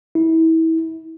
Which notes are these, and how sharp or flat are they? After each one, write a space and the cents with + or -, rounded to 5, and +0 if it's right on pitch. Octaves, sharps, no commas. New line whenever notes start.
E4 -30